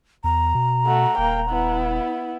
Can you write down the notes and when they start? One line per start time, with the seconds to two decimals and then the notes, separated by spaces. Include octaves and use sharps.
0.24 E2 A#5
0.55 B2
0.86 A3 F#4
1.18 D#1 A#3 G5
1.50 B3 E4